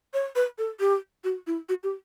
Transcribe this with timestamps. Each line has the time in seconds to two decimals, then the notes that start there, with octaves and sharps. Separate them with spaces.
0.14 C#5
0.36 B4
0.58 A4
0.80 G4
1.24 F#4
1.47 E4
1.69 F#4
1.83 G4